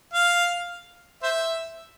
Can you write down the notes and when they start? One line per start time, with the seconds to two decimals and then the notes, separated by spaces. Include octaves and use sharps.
0.13 F5
1.23 C5 E5